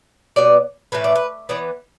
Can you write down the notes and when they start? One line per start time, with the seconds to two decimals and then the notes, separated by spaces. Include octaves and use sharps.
0.36 B2 G3 B3 D5
0.92 A2 E3 A3 B4
1.04 D5
1.15 B4
1.49 E3 B3 D5